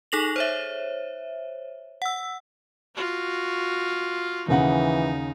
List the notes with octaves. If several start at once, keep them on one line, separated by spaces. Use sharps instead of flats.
D#4 G#4 A4 A#6 F7 F#7
C5 C#5 E5
F#5 E6
F4 F#4
D#2 C#3 E3 D#4 F#5